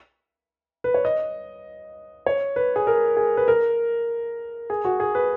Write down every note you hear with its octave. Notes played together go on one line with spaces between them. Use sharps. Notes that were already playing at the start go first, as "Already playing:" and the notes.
B4
C#5
D#5
C#5
B4
G#4
A#4
G#4
B4
A#4
G#4
F#4
G#4
B4